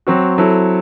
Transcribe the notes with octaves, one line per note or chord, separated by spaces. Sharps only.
F#3 C4 F#4
F#3 C4 E4 A4